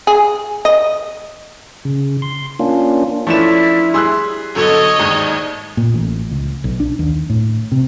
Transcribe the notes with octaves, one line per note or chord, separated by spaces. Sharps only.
G#4
D#5
C#3
C6
A#3 C#4 D4 F4
F3 A3 C#4 D4 E4 B4 E7
G3 G#4 C6 E6 F#6
B2 D3 F#3 A4 C#5 D#5
D#2 G#2 D#3 D5
A#2
A1
C#2
B1
D4
D#2
A2
C3